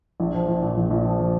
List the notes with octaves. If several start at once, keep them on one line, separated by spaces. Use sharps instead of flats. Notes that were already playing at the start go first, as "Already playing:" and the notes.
A#1
F3
A#1
A#2
A#1
A#1
F3
F3